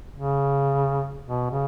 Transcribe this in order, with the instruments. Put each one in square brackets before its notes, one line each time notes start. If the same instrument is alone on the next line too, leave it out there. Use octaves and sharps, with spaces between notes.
[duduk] C#3
B2
C#3